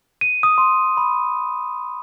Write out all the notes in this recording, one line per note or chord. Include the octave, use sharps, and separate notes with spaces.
D#7
D#6
C6
B5